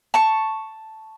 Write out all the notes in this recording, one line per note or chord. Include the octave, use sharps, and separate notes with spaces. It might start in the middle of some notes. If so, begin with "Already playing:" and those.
A5 C#6